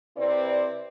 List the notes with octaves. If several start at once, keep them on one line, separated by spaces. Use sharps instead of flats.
C3 C4 E4 B4 D5